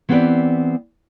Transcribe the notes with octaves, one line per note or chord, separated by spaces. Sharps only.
E3 B3 C4 G4 B4 D5